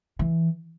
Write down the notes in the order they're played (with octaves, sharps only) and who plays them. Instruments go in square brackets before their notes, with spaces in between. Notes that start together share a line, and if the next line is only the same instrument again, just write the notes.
[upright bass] E3